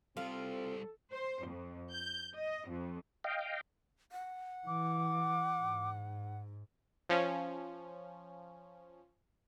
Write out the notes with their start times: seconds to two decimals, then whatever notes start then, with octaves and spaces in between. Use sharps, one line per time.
0.17 G3 C4 F4 A4 C5
1.12 C5
1.46 F2
1.92 G6
2.36 D#5
2.70 F2
3.24 D#5 F5 G5
4.12 F#5
4.67 E3 D6
5.60 G#2
7.09 F3 C#4